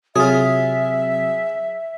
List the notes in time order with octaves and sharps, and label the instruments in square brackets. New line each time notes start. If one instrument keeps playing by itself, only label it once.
[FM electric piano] C3 F#3 [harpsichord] F4 G#4 [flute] E5